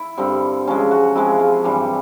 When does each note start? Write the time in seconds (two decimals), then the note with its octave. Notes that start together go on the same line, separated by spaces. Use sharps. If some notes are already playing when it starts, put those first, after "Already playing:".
Already playing: E4
0.17 G2 D3 G3 C4
0.67 C3 F3 G#3 C#4
0.91 F#4
1.15 C3 F3 G#3 E4
1.40 F4
1.64 G2 E3 G3 G4